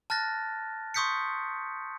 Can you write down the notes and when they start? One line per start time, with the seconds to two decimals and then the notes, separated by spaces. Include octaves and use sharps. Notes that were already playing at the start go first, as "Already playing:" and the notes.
0.10 A5 F6 F#6 A6 A#6
0.94 C6 C#6 D#6 G6 B6 C#7